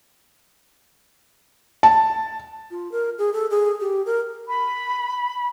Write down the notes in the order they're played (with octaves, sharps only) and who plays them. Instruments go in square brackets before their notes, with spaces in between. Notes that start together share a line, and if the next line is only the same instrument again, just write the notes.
[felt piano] A5
[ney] F4
A#4
G#4
A4
G#4
G4
A#4
[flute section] B5